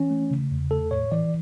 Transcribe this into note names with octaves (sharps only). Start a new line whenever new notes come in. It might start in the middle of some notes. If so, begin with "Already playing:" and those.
Already playing: E3 C#4
A3
C#3
E2
A3 A4
A2 C#5
E3 D5